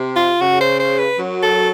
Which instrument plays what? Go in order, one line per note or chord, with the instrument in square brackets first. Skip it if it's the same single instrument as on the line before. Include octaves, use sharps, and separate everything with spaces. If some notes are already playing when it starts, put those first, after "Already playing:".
Already playing: [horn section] C3
[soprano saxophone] F4
[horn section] C#3 [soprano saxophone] F#4
[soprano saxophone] C5
C5
B4
[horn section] F#2 F#3
[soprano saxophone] A4